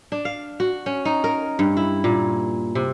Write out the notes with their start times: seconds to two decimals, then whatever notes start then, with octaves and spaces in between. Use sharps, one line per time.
0.12 D4
0.25 F5
0.60 F#4
0.86 C#4
1.05 D#4
1.24 A#4
1.59 G2
1.77 E4
2.04 A#2
2.75 C3